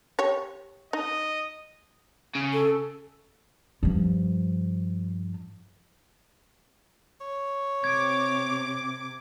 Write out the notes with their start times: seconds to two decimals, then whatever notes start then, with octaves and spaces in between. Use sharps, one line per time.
0.19 G4 C#5
0.93 D#4 D#5
2.35 C#3
2.53 A4
3.83 G2 F3
7.21 C#5
7.84 C3 D6 G#6